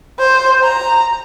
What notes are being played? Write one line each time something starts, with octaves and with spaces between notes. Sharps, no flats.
C5
A#5